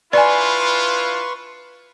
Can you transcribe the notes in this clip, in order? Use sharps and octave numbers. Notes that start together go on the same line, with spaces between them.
D4 E4 F4 B4 D5 G#5 C6 C#6